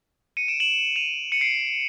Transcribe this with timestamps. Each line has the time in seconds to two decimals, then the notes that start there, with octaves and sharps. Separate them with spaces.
0.37 C#7 D#7
0.48 D7 E7
0.60 E7 F#7
0.96 D#7 F7
1.32 C#7 D#7
1.41 C7 D7